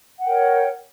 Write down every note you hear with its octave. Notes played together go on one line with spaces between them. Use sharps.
A#4 C#5 F#5 G5